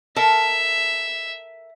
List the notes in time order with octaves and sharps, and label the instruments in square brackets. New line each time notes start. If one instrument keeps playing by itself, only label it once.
[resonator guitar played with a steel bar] A4 A#4 A5 [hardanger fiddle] E5